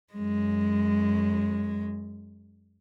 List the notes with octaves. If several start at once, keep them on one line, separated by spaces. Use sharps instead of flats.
F#2 G#3